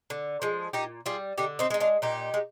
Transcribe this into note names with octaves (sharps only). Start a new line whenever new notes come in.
D3
F3 G#3
A#2 D#4 G4
G3 F4 G#4
D3 D#4 G4
C4 D#4
G#3 D#4
D4 F4
A#2 D#4 G4
G#3